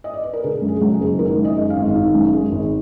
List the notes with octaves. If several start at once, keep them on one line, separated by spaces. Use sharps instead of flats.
D#5
D5
B4
A#4
D3 G#4
F#2
G#4
F#3
G#4
F#1
D#3 A#4
F#2
D#5
G#3
F5
G#1
D#3
F#2
G#3
G#1